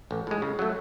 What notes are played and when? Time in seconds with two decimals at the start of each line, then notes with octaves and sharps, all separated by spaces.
0.11 A1
0.27 A2 G#3
0.42 C#3
0.59 F#3 A3